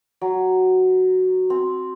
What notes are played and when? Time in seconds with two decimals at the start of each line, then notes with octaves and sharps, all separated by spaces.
0.21 F#3
1.50 C4